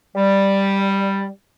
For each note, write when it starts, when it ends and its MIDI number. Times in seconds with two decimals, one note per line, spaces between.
0.16 1.26 55